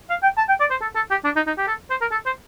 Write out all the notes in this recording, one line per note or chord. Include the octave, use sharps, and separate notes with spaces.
F5
G5
A5
G5
D5
C5
A4
A4
G4
D4
D#4
D#4
G4
A4
C5
A#4
A4
C5